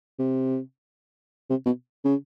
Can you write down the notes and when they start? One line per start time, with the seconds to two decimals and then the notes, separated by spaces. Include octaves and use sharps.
0.19 C3
1.50 C3
1.66 B2
2.05 C#3